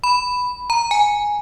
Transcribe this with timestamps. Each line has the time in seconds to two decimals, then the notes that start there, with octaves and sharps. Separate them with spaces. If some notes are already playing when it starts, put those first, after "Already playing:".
0.04 B5
0.70 A#5
0.91 G#5